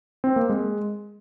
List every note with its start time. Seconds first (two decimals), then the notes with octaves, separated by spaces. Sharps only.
0.24 C4
0.36 A#3
0.49 G#3